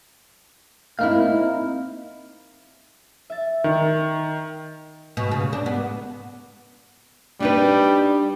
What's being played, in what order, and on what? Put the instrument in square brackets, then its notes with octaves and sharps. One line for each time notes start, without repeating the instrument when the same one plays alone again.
[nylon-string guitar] A#3 E4 [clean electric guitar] C4 D#4 F5
[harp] E5 A6
[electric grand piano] D#3
[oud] B2
C#3
D4
B3
[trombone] G3 [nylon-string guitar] D4 D#4 B4